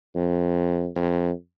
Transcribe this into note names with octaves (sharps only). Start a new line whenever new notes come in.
F2
F2